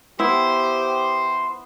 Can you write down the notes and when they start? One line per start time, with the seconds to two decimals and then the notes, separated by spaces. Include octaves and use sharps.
0.20 B3 E4 G4 C5